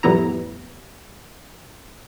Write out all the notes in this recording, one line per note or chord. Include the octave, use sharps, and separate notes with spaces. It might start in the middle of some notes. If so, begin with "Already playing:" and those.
F2 A2 G3 B3 E4 A#5